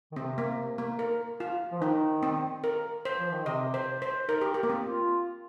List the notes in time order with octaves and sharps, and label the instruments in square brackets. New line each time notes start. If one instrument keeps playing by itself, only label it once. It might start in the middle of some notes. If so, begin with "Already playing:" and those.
[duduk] D#3
[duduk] C3 [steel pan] C4
[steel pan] A#3
A#3
A#4
F4
[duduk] F3
[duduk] D#3 [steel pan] D#4
[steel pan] C4
A#4
C5
[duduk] F3
D#3
[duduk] C3 [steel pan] D#5
[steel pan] C5
C5
[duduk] D#4 [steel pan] A#4
[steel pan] G4
[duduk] G4 [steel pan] A#4
[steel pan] A#3
C4
[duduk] F4